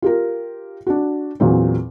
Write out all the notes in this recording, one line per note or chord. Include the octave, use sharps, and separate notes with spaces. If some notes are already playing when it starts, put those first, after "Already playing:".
F4 G4 A#4
D4 F#4
E2 A#2 F#3 C4